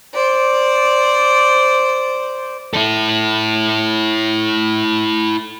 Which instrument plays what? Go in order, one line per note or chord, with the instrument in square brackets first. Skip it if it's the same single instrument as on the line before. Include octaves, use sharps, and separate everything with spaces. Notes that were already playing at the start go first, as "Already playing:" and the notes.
[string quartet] C5 D5
[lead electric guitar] E4 A4